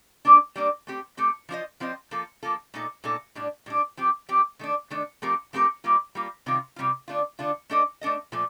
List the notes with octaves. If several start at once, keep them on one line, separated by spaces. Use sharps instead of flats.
G3 A#3 D4
G3 A#3 D4
A3 C4 G4
A3 C4 G4
F3 C4 F4 C5 D#5
F3 C4 F4 C5 D#5
F3 A#3 F4 A4
F3 A#3 F4 A4
A#2 A3 D#4 A4
A#2 A3 D#4 A4
A2 G3 D4
A2 G3 D4
F3 C4 G4
F3 C4 G4
D#3 A3 D4
D#3 A3 D4
F3 A3 C4 G4 A#4
F3 A3 C4 G4 A#4
G3 A#3 F4
G3 A#3 F4
C3 D#3 G3 C4 F4
C3 D#3 G3 C4 F4
D3 A3 D4 F4
D3 A3 D4 F4
A3 D4 A4 D#5
A3 D4 A4 D#5
A#2 F3 A3